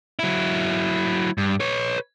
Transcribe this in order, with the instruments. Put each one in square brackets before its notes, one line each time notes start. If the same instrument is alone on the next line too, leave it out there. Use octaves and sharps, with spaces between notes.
[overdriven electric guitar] F#3 E4
G2
B4 C#5